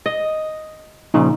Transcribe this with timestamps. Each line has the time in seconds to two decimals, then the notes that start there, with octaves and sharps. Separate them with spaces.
0.06 D#5
1.14 A#2 C#3 F3 D#4